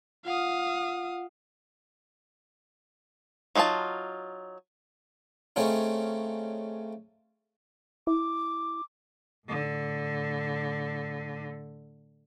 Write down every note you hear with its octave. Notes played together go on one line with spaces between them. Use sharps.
F4 F5 F#5 D#6
F#3 D#4 F4 F#4 A5
C#3 A3 C4 C#4 D#4
E4 D6
A2 D3